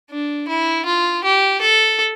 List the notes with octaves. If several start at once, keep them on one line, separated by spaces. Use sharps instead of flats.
D4
E4
F4
G4
A4